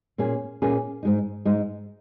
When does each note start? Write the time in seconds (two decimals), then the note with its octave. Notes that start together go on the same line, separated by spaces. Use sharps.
0.18 A#2 A#3 C#4 G#4
0.62 A#2 A#3 C#4 G#4
1.03 G#2 G#3 D#4
1.45 G#2 G#3 D#4